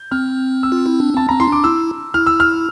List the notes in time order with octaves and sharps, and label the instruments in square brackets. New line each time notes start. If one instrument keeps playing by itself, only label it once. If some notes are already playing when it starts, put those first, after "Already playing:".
Already playing: [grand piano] G6
[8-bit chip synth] C4 [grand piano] F6
[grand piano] E6
[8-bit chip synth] F4
E4
D4
[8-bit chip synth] C4 [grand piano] A5
[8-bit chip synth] C4 [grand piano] A#5
[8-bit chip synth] E4 [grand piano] C6
[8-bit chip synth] D4 [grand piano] D6
[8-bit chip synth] E4 [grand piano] E6
[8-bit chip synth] E4 [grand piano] F6
[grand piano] E6
F6